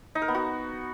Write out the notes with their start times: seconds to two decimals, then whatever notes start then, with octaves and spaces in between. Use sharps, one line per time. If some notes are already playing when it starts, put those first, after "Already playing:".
0.15 D#4
0.22 A#4
0.28 B3
0.35 F#4